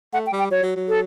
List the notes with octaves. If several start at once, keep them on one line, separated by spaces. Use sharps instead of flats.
A3 F#5
G5
G3
G5
F#3 C#5
F#3
F#3
A4